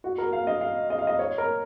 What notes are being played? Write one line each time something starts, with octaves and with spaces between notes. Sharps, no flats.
F#4
A#4
F5
D#5
F5
D#5
F5
D#5
C#5
A#4